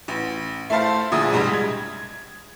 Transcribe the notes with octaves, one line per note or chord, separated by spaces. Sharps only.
A1
A3 E4 A4 C5 F5
D2 A#2 F3 G#4 E5 D#6
C2 G2 G3 G#3
G#6